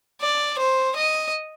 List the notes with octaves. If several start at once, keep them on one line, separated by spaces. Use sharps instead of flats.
D5
C5
D#5